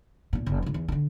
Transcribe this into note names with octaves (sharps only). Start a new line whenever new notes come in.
E1 A#2
F#1
C#2 G#2
E2
D3 D#3